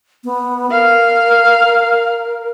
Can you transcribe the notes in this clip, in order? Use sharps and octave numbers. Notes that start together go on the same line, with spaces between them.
B3
A#4 F5